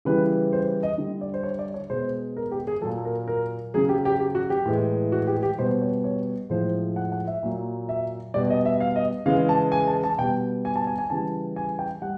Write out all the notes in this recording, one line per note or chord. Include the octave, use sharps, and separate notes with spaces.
C#3 E3 G3 B4
C5
D#5
D3 G3
D5
C5
C#5
D5
C#5
B2 G#3 C5
A#4
G4
G#4
A#2 F#3 A4
A#4
A#4
C#3 F#3 G#4
G4
G4
G4
F#4
G4
A2 E3 G#3
F#4
G4
G4
B2 G3 C5
C#5
C#5
A2 F3 G#3 C5
F#5
F#5
E5
A#2 F#3
E5
B2 G3 D5
D#5
E5
F5
D#5
C#3 E3 G#3 F5
A5
G#5
A5
A5
B2 G3 G5
G#5
A5
G#5
G#5
C#3 E3 G3 A5
G#5
G5
G3 F#5